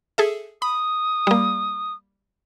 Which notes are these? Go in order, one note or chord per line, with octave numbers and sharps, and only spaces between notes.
G#4 A4 E5
B5 D#6
G3 A#3